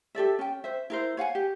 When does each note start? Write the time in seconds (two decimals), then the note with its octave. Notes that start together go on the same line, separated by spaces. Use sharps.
0.15 G4 A4 D5 E5
0.39 C#4 G5
0.64 C5 E5
0.90 E4 A#4 C5
1.17 C#5 F5 F#5 G#5
1.35 G4